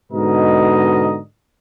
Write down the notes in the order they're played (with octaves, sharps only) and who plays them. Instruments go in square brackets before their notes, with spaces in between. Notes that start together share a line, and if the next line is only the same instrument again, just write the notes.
[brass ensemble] G#2 B2 D3 A#4 D#5